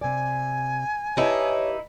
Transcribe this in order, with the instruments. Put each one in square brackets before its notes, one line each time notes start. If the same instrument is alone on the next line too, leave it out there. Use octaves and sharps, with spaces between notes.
[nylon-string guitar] C3 D5 [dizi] G#5
[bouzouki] D#4 E4 [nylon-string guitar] G4 B4 A5 [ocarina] C#5